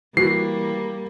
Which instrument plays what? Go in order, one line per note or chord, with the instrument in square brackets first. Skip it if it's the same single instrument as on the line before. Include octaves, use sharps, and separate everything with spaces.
[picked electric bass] E3 [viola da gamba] G3 A#3 [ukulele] F#4 [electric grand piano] C7